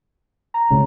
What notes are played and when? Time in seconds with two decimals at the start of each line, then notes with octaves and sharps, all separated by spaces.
0.54 A#5
0.70 C#2 G#2 C#3